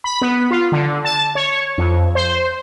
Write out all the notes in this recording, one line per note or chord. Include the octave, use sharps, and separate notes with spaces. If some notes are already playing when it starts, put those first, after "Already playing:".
B5
B3
F4
D3
A5
C#5
F2
C5